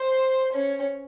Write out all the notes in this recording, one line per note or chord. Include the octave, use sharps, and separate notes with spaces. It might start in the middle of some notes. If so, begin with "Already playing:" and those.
Already playing: C5
C#4